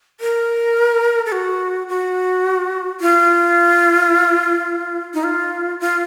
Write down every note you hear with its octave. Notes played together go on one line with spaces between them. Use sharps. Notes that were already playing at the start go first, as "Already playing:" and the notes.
A#4
A4
F#4
F#4
F4
D#4
F4
F4